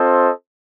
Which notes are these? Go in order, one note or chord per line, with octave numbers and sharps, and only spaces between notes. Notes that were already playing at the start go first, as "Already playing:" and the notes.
Already playing: C4 F4 A4 C5 D#5